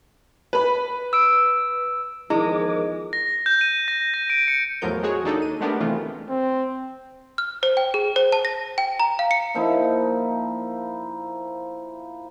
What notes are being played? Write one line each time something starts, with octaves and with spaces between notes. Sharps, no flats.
B4 B5
E6 D7
E2 D#3 F3 G#3 E4 A#4 D6
A#6
G6
D#7
A#6
A#6
D7
C#7
E2 A2 F3 F#3 A#4 G6
G#3 F#4 G#4 C#5
D#2 D4 D#4 A4
D#7
G#3 A3 B3 D4 G4 A#4
C3 D#3 E3 A3 F4
C4
F6
C5
G5
G#4
C5
A5
A#6
G5
A#5
F5
C#7
A#2 F3 D#4 E4